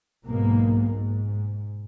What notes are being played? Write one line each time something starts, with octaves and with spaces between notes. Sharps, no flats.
B1 G#2 B2 A#3
G#2